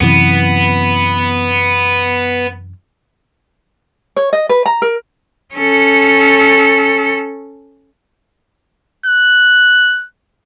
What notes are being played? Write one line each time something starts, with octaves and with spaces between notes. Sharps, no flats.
F#2 C3 E3 B3
C#5
D#5
B4
A#5
A#4
C#4 A4
F#6